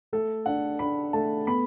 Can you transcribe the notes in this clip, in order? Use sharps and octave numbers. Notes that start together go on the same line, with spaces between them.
A3 A4
D4 F#5
D4 B5
A3 A5
B3 B5